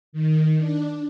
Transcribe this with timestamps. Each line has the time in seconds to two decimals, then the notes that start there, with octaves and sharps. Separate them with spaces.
0.12 D#3
0.57 D4